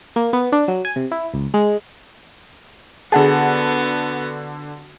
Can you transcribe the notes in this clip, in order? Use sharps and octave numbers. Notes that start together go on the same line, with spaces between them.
A#3
B3
D4
F#3
G#5
C3
E4
C#2
G#3
D3 B3 F#4 G#4 F#5 A5